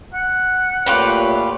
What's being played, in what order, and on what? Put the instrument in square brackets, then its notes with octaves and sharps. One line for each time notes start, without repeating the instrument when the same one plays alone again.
[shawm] F#5
[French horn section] A#2 A3 C#5 [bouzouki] F4 G4 B4